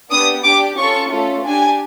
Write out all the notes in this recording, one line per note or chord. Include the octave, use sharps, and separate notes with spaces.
B3 D4 G4 D#6
D4 G4 D6
C#4 F4 A4 C#6
A3 C#4 F4 A4
D4 G4 G#5